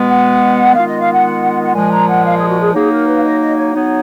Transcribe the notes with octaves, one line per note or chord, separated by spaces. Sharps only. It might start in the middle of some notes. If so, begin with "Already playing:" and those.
Already playing: B2 G#3 B3
F#5
D#3 G#3 B3 F4 F5
D#5
F5
F#5
F#5
A#2 F3 G#3 G#5
A#5
F#5
F5
G#4
F#4
G#4
F#3 A#3 D#4 G#4
A#4
B4
F5
D#5
D#5
C#5
F#3 B3 D#4 C#5